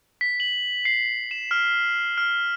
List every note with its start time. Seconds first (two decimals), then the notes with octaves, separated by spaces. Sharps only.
0.21 B6
0.40 F#7
0.85 C7
1.31 E7
1.51 F6
2.18 F6